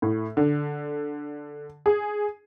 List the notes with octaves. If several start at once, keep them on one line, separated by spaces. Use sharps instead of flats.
A2
D3
G#4